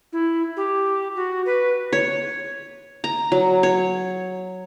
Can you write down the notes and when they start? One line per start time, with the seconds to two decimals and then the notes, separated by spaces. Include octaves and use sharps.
0.13 E4
0.57 G4
1.15 F#4
1.46 B4
1.93 C#5
3.04 A#5
3.32 F#3
3.63 C#5